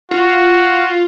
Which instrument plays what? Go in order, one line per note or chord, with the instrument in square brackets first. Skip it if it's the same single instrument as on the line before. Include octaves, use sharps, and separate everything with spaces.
[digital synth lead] F4 [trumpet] F#4